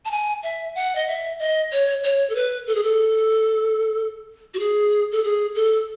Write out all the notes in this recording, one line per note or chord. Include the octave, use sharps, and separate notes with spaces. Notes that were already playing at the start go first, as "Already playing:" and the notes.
A5
G#5
E5
F#5
D#5
E5
D#5
C#5
C#5
A4
B4
A4
G#4
A4
F#4
G#4
A4
G#4
A4